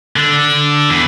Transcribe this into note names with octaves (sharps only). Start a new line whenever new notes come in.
D3
E2